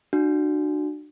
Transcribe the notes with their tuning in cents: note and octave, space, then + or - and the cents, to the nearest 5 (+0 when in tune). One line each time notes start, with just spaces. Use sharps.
D4 +35 F#4 +0